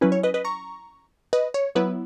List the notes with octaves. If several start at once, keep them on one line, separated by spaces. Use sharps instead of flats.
F#3 C#4 E4 B4
C#5
B4 D#5
B4 D#5
A#5 C#6
B4 D#5
C#5
F#3 B3 E4 B4